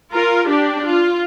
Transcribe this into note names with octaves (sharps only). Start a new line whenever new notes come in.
F4 A#4
D4 G4
F4